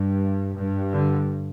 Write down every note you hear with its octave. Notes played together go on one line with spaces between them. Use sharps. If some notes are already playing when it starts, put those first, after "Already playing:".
Already playing: G2
G2
D3